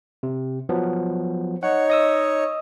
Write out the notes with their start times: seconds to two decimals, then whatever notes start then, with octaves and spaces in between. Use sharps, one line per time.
0.23 C3
0.69 F3 F#3 B3
1.63 D#4 C#5 F#5
1.90 D#5 D#6 E6